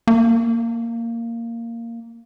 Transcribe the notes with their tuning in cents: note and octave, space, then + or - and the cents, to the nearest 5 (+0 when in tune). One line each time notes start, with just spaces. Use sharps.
A#3 -10